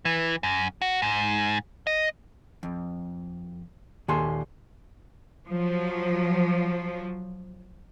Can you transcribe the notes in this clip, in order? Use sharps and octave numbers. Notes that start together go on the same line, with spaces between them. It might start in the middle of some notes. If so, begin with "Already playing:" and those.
E3
F#2
F#4
G#2
D#5
F2
D#2 A#2 G#4 A4 G#5 C6
F3 F#3